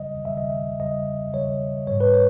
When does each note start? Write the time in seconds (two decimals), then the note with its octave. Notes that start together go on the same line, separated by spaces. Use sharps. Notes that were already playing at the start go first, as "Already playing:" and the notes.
Already playing: E2 C#3 G3 D#5
0.25 E2 C#3 G3 E5
0.38 D#5
0.50 E5
0.80 E2 C#3 G3 D#5
1.34 E2 C#3 G3 C#5
1.87 G#2 G3 C#5
2.01 B4
2.14 C#5